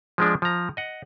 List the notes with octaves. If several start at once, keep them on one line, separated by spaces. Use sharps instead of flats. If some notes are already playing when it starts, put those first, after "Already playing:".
F3 G#3 D4
F3 A#5
D#5 F#5